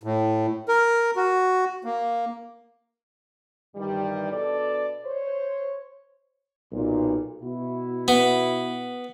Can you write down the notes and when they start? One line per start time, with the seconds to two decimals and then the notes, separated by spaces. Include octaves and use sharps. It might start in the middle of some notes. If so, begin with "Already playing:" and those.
0.03 A2
0.68 A#4
1.16 F#4
1.84 A#3
3.75 G2 D#3 E3 G3
4.32 B2 D4 A4 D5
5.06 C5 C#5
6.72 B1 A#2
7.42 B2 E4 F#4
8.08 B3